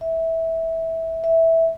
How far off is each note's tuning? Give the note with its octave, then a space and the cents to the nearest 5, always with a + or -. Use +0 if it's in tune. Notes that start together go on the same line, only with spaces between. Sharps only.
E5 -15
E5 -10